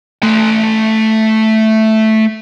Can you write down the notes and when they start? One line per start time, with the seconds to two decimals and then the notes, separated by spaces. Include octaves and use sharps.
0.23 A3 C6